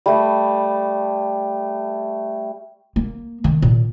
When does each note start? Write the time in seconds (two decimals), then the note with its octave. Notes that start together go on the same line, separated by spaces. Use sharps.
0.06 G3 A3
2.96 A#3
3.44 D#3
3.62 A#2